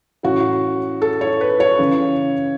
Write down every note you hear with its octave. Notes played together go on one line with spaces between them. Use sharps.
A2 E3 C#4 F#4
A4
C#5
B4
C#5
C#3 E3 C#4